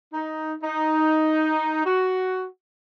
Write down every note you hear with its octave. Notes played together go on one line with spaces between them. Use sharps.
D#4
D#4
F#4